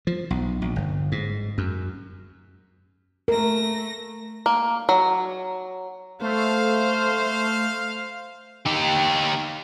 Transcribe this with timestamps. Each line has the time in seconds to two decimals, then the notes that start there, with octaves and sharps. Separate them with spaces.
0.07 F3
0.30 B1
0.62 A#1
0.76 G1
1.12 G#2
1.58 F#2
3.28 A3 A#4 A#6
4.46 A#3
4.89 F#3
6.22 A3 C5 F5
8.66 D#4 G4